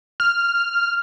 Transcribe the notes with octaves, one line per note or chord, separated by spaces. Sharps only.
F6